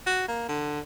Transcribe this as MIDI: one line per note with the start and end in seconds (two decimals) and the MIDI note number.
0.06 0.24 66
0.28 0.46 58
0.49 0.80 50